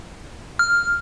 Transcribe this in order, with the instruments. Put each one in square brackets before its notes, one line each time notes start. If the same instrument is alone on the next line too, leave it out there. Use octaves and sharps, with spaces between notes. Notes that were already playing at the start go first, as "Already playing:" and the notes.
[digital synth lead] F6